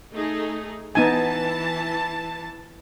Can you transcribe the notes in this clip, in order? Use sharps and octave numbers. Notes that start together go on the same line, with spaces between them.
A3 D#4 G#4
E3 B3 D#4 G#5 A5